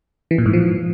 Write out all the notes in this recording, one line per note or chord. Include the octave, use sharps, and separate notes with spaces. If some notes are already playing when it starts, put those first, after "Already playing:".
E3
A#2
G#2
F3